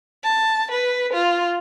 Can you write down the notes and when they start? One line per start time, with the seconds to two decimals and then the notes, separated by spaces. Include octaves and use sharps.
0.24 A5
0.71 B4
1.13 F4